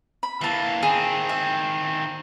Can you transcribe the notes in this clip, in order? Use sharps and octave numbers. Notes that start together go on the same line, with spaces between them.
B5
E3 A#3 E5 A5
D#3 C4 G#4
E5